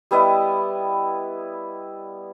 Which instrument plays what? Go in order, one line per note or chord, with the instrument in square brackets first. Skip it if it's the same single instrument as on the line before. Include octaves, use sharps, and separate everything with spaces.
[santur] G3 B3 E4 D#5